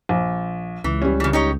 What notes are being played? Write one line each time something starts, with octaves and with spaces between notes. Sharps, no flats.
A#1
C#2 E3
G3 C#4
C#3 E3
D#4 G4 C#5